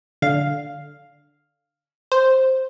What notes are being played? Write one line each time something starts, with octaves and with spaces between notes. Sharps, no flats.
D3 F5
C5